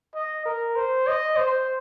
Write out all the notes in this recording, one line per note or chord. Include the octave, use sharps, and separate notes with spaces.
D#5
A#4
C5
D#5
C5